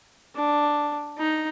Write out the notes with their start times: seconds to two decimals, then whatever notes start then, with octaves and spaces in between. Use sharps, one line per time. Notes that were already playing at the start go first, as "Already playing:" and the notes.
0.36 D4
1.18 D#4